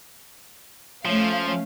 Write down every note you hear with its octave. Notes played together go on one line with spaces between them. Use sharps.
F3 A3 C#4 F5